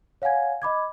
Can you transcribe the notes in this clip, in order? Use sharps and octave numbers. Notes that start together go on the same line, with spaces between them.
C#5 F5 F#5 G#5 G#6
D#5 B5 D6 G#6